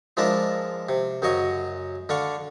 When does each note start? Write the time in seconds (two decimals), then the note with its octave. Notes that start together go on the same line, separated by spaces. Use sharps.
0.17 F3 G#3 D4 F4 A#4 E5
0.89 C3
1.22 F#2 C#3 F#3 D#5 C#6
2.09 D3 D4 F5 C#6